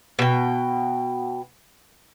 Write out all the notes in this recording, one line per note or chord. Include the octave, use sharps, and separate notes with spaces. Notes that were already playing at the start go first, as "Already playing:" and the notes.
B2 G5